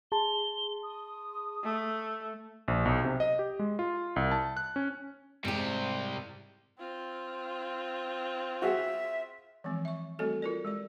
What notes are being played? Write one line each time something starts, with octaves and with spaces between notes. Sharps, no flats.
G#4 A5 C6 G7
D#6
A3
A#1
B1
C3
D#5
G4
G#3
F4
C2
A5
F#6
C#4
G#2 C3 G3 G4
C4 F4
F#4 G#4 E5
E3 F3 G#3 C4
E5 C#6
G3 A3 C4 F#4 A4 C#5
F4 A#4 D5
G#3 G4 D5